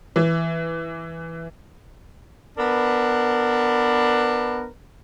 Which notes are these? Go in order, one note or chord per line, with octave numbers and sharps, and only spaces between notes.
E3
B3 D4 A#4 B4